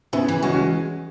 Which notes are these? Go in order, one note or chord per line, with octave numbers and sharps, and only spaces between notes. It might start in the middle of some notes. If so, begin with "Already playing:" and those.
C#3 B3 E4
E3
G#3 C#4 F#4
C#4 F#4